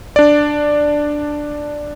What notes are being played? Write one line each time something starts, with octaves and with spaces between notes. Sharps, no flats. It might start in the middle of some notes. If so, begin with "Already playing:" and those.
D4 D5